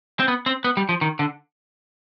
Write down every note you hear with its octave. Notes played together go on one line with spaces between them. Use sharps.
C4
B3
C4
B3
G3
F3
D#3
D3